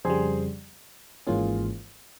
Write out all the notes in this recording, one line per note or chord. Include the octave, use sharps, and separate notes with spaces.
F2 C#3 G3 G#4 C5
G#1 G#2 E3 A#3 C#4 F4 G#4